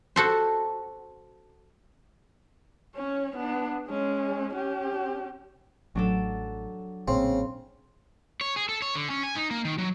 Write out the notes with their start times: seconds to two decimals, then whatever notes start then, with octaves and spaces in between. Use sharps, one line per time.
0.16 F#4 A4 C5
2.95 C#4 C#5
3.36 B3 D4
3.87 G#3 C#4
4.54 C#4 G4
5.95 A1 A2 F#3 D4 A4
7.08 A1 A#2 C#3 C4
8.41 C#5
8.56 G#4
8.69 A4
8.82 C#5
8.96 D3
9.10 C#4
9.23 G#5
9.36 D#4
9.51 A#3
9.65 D#3
9.78 F#3